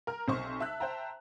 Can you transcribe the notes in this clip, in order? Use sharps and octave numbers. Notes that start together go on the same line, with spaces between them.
A#4 F6
B1 C3 C5 C6 C#6
E5 A5 E6 F#6
C5 E5 G5 A5 A#5